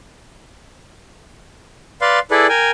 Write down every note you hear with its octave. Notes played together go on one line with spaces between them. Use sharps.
B4 D5 F5 C6
E4 G#4 A4 B4 D5
A#4 G5 G#5